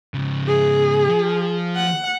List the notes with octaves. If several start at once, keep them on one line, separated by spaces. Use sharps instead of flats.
G#2 C#3
G#4
F3
F#5